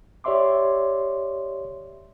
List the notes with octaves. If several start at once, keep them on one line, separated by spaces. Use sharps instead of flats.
G4 C#5 D5 E5 C6 D6